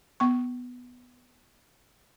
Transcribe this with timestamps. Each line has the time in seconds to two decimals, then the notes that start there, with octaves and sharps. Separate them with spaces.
0.20 B3 C#6